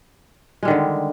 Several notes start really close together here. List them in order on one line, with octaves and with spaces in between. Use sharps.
G#3 G3 D#3 D3